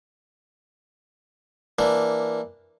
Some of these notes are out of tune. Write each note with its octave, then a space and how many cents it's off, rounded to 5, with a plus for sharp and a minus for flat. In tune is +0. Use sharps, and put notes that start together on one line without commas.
E3 +0 A#3 +0 D4 +0